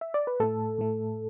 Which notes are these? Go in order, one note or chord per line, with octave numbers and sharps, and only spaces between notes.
E5
D5
B4
A2 A3 A4
A2 A3